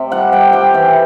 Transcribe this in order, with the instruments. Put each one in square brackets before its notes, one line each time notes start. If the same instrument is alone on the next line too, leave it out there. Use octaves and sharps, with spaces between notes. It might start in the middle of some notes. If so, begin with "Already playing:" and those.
Already playing: [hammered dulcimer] C3 E5
G3 F#5
G3 G5
G3 G5
E3